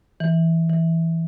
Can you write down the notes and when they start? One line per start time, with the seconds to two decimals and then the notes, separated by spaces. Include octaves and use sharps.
0.20 E3
0.69 E3